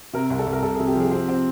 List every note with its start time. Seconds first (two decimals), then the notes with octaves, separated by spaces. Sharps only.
0.13 C3 A#4
0.30 C2
0.39 A4
0.47 C2
0.53 A#4
0.62 C2 A4
0.75 G#4
0.80 C3
0.87 G4
0.95 F3 G#4
1.11 C4 G4
1.29 C4